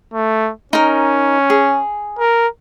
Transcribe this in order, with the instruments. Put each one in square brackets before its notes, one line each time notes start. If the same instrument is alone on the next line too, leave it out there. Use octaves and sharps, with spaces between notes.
[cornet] A3
[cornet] C#4 [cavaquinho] D#4 A#4
[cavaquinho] G#4
[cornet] A#4